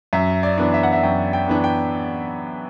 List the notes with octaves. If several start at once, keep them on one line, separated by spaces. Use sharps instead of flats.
F#2 E5
D5
E3 B3 D4
E5
F#5
E5
F#2 G5
G5
E3 B3 D4
G5